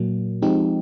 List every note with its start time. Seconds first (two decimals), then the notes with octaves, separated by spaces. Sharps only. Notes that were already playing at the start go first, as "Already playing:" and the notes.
Already playing: A#2 F#3 A#3
0.42 F3 G#3 C4 D#4 G4